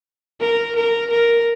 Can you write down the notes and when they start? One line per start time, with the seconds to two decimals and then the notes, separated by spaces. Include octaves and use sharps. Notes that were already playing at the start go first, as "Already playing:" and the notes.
0.41 A#4
0.76 A#4
1.10 A#4